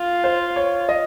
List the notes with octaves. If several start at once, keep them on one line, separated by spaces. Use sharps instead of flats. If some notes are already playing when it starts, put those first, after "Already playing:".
Already playing: F4
C5
C#5
D#5